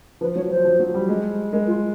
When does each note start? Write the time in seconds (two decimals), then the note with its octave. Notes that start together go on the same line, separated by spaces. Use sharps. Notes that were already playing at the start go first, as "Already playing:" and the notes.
0.21 F3 B4
0.35 F#3 C#5
0.50 F3 C5
0.65 F3
0.79 F#3
0.94 G3
1.09 G#3
1.52 G#3 A#4
1.67 F4